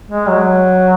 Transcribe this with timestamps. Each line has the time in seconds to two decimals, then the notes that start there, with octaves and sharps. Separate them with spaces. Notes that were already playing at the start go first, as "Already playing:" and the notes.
0.11 G#3
0.28 F#3